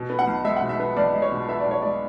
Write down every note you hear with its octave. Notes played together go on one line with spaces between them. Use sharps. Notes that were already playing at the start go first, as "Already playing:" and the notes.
Already playing: B2
B3
F#5
B1
G#3 E5
F#5
B2
E5
B3
B1 D5
G#3
C#5
B2
B3 E5
D5
B1 C#5
G#3 D5